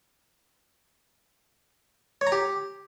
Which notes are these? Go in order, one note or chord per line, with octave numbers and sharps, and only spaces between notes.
C#5
A#5
G4